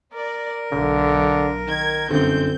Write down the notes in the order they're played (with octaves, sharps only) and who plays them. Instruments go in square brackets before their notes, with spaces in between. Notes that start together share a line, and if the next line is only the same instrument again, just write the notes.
[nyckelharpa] A#4 [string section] D5
[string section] B1 [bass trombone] D3
[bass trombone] D#3 [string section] G#6
[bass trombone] G1 [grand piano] F#2 D3 [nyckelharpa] C4 [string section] G6